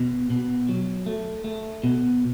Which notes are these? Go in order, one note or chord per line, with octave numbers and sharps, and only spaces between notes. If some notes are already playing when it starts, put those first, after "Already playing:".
Already playing: B2
B2
F#3
A3
A3
B2